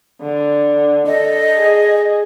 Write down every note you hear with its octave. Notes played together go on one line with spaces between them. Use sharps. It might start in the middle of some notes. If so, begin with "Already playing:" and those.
D3
A4 D#5
G#4